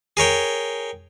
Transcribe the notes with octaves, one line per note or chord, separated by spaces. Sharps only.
G#4 A#4 C#5 G5